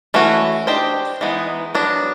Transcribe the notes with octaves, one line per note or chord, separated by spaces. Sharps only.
E3 A3 C#4 F#4
D4 G4 C5 D#5
E3 G#3 B3 D#4
F#3 B3 D4